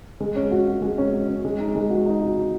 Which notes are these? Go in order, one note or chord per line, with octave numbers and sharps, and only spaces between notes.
G#3
C#4
F#4
F#4
G#3
C#4
F#4
C#4
G#3
D#4
G#3
F#4
D#4
F#4
F#4